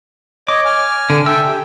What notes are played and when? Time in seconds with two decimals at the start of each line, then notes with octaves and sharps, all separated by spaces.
0.48 C#5 D#5 D6
0.65 G#5 F6
1.10 D3
1.26 A4 E5 G5 E6
1.48 G4